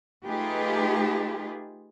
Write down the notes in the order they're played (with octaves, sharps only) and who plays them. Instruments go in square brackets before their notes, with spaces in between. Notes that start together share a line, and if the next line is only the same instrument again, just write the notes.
[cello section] A3 D#4 F4 G4 G#4 B4